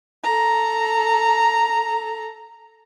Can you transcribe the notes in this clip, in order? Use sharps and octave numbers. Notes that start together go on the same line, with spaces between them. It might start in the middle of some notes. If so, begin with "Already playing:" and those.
A4 A#5